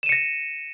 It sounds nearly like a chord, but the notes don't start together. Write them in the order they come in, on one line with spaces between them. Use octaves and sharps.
E7 D#7 C#7 A#6